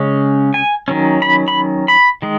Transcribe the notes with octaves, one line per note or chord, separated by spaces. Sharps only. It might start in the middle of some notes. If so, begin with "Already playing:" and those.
Already playing: C#3 G#3 C#4
G#5
D#3 F#3 C#4
B5
B5
B5
D#3 G#3